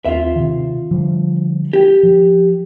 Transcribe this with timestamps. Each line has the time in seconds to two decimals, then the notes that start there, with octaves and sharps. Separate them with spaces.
0.05 D#2 C4 F4 E5
0.35 C3 D#3
0.91 D3 F3 G3
1.73 G4
2.03 F3